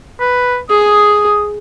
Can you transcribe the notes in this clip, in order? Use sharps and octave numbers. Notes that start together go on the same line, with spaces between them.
B4
G#4 D#6